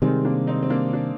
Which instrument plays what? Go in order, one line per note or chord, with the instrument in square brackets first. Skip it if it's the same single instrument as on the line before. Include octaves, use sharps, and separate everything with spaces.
[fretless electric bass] C3 D#3 G3 [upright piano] G#3 C4
[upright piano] A#3 D4
C4 D#4
C4
A#3 D4
D4